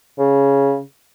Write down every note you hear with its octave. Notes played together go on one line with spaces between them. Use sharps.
C#3